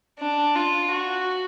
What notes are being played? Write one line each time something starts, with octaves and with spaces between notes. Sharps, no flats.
D4
F4
F#4